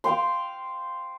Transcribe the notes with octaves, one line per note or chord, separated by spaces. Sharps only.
C5 F5 G5 C6